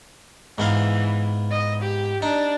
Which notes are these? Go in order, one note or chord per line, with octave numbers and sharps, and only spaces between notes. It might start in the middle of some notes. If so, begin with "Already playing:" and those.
G#2 E3 B3 F5
D#5
G4
D4 D#4